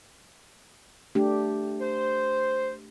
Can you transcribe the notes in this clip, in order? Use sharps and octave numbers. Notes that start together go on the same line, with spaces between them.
A3 D4 G4
C5